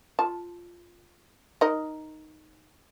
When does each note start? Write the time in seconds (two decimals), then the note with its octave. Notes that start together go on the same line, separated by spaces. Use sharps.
0.19 F4 A5
1.61 D#4 A#4 D#5